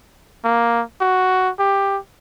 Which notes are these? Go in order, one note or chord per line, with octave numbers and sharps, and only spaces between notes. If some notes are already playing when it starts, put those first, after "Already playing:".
A#3
F#4
G4